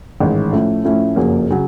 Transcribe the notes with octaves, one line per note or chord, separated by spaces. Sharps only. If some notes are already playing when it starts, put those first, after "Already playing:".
A1 G#2 D#3 G#3
A2 F3 A3 C#4 E4
A2 F3 A3 C#4 E4
F#1 F2 C#3 F#3 A#3
C#3 F#3